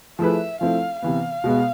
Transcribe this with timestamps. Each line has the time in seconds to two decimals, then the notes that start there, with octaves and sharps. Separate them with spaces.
0.19 F3 A3 E4 G#4 B4 E5
0.61 F3 A3 C4 E4 F5
1.02 C3 E3 B3 F5
1.44 B2 G#3 B3